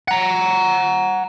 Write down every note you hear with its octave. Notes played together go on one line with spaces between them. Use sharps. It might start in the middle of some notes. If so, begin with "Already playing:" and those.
F#5 A#5